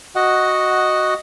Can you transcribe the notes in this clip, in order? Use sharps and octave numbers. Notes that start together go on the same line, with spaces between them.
F#4 D#5 F#5